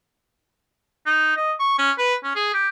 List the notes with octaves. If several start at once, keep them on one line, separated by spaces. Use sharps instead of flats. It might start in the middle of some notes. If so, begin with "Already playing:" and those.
D#4
D#5
C#6
C#4
B4
C#4
G#4
G4